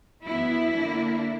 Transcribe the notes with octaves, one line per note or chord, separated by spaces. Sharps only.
F#2 E3 B3 E4
D3 A#3 D4